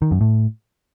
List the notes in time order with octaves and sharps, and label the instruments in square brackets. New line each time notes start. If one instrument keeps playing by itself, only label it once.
[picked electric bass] D#3
F#2
A2